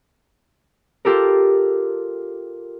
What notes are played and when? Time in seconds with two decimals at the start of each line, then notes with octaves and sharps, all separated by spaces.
1.05 F4 G4 A4 A#4